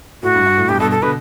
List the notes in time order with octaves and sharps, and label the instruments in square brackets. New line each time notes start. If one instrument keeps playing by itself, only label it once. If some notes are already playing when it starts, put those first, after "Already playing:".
[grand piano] A2 [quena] F#4
[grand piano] G2
G2
A2
[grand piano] G2 B2 [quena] G4
[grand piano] G2 B2 [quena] A4
[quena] A4
[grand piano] B2 D3 [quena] B4